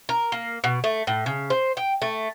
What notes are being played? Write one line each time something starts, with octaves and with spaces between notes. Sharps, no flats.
A#4
A#3
B2
A3
A2
C#3
C5
G5
A3